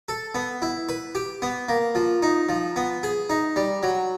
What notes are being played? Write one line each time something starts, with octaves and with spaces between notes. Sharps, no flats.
A4
B3
E4
B4
G4
B3
A#3
F3
D#4
F3
B3
G#4
D#4
G3
F#3